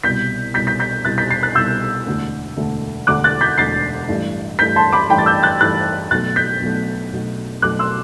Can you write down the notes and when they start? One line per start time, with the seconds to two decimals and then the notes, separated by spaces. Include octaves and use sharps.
0.03 C2 B2 G3 G6 B6
0.54 C2 B2 G3 G6 B6
0.67 G6 B6
0.80 G6 B6
1.05 C2 B2 G3 F#6 A6
1.18 G6 B6
1.30 A6 C7
1.43 F#6 A6
1.55 C2 B2 G3 E6 G6
2.06 E1 D2 D3 A3
2.57 E1 D2 D3 A3
3.07 E1 D2 D3 A3 D6 F#6
3.24 F#6 A6
3.41 G6 B6
3.58 E1 D2 D3 A3 A6 C7
4.08 A1 G2 E3 A3
4.59 A1 G2 E3 A3 G6 B6
4.76 A5 C6
4.92 B5 D6
5.09 A1 G2 E3 A3 G5 B5
5.18 A6
5.26 E6 G6
5.43 F#6 A6
5.60 A1 G2 E3 A3 F#6 A6
6.11 B1 B2 F#3 A3 F#6 A6
6.36 G6 B6
6.61 B1 B2 F#3 A3
7.13 B1 B2 F#3 A3
7.62 B1 B2 F#3 A3 D6 F#6
7.79 C6 E6